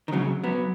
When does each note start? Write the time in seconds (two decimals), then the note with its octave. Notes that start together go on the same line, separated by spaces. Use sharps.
0.08 D#3
0.13 C#3 F#3
0.44 F#3 B3